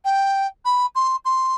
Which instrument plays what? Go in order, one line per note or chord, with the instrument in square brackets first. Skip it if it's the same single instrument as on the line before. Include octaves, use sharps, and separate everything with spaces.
[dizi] G5
B5
C6
C6